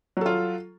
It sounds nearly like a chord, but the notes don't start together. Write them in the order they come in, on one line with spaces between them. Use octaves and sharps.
F#3 A4 F4